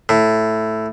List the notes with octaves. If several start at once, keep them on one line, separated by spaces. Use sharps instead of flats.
A2